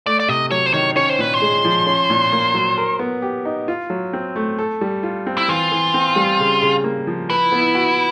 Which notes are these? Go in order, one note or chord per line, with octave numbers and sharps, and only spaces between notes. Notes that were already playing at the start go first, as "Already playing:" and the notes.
A3 D5
D5
C3 D#5
F#3 C#5
C5
D#3 C#5
C#4 C#5
C5
A#2 B4
C5
G#3
F3
C#4
A#2
A#3
F#3
A#4
B3
G4
D#4
F4
F#3
C4
A3
A4
G3
F4
C4
E4
E3 F4
E3
C4
G3
C#3
C#3
A#3
F3
E4 B4
B3
F#4